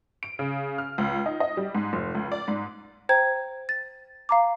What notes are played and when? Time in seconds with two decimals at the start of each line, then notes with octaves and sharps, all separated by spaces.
0.23 D7
0.39 C#3
0.78 F6
0.98 C#2
1.26 D#4
1.40 D#5
1.57 G3
1.75 G#2
1.93 F1
2.15 C#2
2.32 D5
2.48 G#2
3.09 C5 G5 A#5 G#6
3.69 A6
4.29 F5 A#5 D6